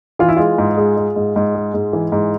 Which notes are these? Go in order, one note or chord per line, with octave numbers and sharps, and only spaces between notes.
E3 F4
E4
G#3 F4
G#2
G#3
G#3
G#2
G#2
G#3
G#2
E3
G#2